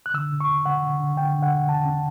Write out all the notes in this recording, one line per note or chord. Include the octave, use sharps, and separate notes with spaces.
F#6
D3 E6
D3
C#6
E2
D3 F#5
D3
D3
D3 G5
D3
F#5
E2
E2 A5
C#4